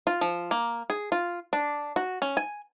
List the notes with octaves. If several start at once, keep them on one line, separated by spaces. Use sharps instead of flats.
F4
F3
A#3
G#4
F4
D4
F#4
C#4
G#5